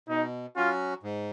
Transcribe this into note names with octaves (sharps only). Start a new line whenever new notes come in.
B2 D#4
F#3 C#4 F4 F#4
G#2